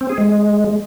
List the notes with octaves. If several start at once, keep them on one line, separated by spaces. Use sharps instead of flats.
C4
G#4
G#3